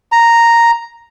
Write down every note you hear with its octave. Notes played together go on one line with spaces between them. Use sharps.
A#5